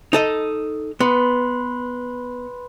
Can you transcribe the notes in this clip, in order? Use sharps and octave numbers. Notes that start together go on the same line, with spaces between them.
D#4 A4 D#5
B3 B4 B5 C6